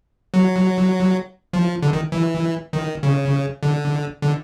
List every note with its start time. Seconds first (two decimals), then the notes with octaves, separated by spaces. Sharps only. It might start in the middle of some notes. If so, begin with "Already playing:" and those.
0.34 F#3
1.53 F3
1.82 D3
1.93 D#3
2.12 E3
2.73 D#3
3.03 C#3
3.63 D3
4.22 D3